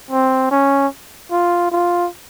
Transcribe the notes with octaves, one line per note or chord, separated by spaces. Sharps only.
C4
C#4
F4
F4